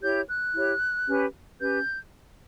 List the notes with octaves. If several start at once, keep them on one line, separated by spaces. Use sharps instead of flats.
E4 G4 C#5 G6
F#6
E4 G4 C#5
C#4 G4 B4
C#4 G4 B4 G6